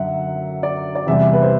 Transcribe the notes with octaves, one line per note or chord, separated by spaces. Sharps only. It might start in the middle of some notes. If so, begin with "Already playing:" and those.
Already playing: F#2 D3 F#3 E5 F#5
D5
D5
E2 C3 G3 E5
B4
C5